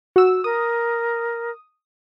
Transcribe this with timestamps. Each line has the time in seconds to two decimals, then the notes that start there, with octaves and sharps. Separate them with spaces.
0.16 F#4 E6
0.44 A#4 D#6